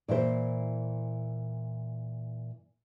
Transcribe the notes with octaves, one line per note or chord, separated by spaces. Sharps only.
A#2 E3 E4 C5